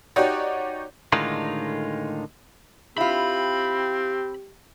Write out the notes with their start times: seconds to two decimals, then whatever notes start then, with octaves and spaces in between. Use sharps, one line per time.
0.16 D#4 F#4 G4 C#5 D5
1.12 A2 D3 D#3 G#3 D#4 F4
2.98 C4 E4 F4 G4 B5